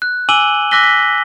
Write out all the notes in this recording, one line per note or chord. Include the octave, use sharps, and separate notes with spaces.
F#6
G#5 D6 E6 D#7 F#7 G7
D6 E6 F#6 A#6 B6 G7
B6